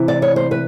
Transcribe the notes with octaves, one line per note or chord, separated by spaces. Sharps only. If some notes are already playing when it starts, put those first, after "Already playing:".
Already playing: C3 E3
D5
C#5
C5
B4